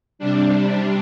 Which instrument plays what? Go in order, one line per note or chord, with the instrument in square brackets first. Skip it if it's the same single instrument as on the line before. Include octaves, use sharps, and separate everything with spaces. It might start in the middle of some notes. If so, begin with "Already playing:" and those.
[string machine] C3 G3 D4